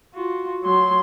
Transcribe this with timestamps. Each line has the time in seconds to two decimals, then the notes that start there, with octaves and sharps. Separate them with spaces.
0.14 F4 F#4
0.64 F#3 C6